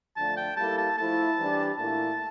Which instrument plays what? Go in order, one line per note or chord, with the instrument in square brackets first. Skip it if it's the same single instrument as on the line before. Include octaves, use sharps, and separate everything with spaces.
[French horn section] F2 D3 F3 A3 D4 [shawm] A5
[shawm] G5
[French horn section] G3 A#3 E4 A4 [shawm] A5
[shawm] A5
[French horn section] F3 A3 E4 [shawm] A5
[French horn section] E3 G3 D4 G4
[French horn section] A#2 A3 E4 [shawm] A5